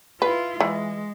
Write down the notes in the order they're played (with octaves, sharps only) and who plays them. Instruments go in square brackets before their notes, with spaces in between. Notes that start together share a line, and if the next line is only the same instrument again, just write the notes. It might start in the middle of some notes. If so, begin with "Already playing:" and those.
[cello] E4 F4 [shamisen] B4
[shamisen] E3 [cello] G#3